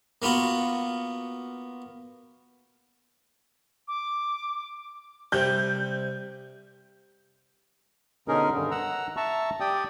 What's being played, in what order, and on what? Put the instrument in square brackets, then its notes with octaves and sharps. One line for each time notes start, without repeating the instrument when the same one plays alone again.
[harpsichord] A#3 B3 F4 F#4
[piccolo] D6
[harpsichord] C3 G3 [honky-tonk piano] G6
[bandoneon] B2 D3 C#4 D#4 G#4 A#4
G2 D3 D#3
F#5 A#5 E6
E5 A5 A#5 C#6 E6
G4 D5 G5 D#6